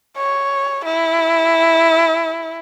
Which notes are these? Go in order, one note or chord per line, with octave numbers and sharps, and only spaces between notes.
C#5
E4